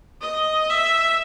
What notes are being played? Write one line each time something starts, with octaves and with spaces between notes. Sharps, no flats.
D#5
E5